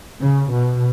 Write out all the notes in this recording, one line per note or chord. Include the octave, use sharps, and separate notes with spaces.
C#3
B2